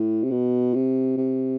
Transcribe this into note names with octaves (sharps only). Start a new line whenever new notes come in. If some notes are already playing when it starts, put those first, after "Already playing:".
Already playing: A2
C3
B2
C3
C3